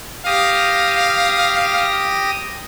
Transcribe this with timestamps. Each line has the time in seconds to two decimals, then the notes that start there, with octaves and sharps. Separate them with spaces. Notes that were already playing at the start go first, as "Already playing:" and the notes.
0.26 G4 F5 D#6 A#6